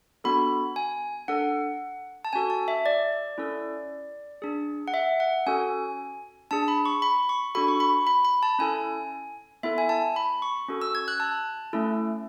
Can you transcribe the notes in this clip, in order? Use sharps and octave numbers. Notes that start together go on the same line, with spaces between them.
B3 D4 F#4 A4 B5
G#5
D4 A4 F#5
A5
C#4 F#4 A4 G#5
A5
E5
D5
C#4 E4 A4
D4 G#4
F#5
E5
F#5
C#4 F#4 A4 G#5
D4 G#4 A5
B5
C#6
B5
C#6
D4 F#4 A4 B5
C#6
B5
B5
B5
A5
C#4 E4 A4 G#5
B3 E4 A4 E5
G#5
A5
B5
C#6
C#4 F#4 A4
E6
G#6
F#6
A5
A3 C#4 E4 A4